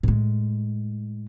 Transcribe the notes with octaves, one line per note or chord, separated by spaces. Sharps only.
A2 G#3